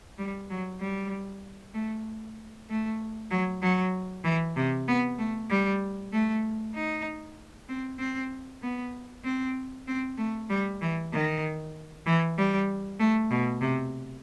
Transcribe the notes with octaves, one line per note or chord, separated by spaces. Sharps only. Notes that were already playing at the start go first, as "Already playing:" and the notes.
G3
F#3
G3
A3
A3
F#3
F#3
E3
C3
B3
A3
G3
A3
D#4
C4
C4
B3
C4
C4
A3
G3
E3
D#3
E3
G3
A3
B2
C3